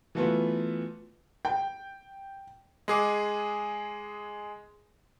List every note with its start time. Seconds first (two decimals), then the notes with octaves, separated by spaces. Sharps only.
0.15 E3 F#3 A3 B3 F4 B4
1.45 G5
2.88 G#3 G#4 D6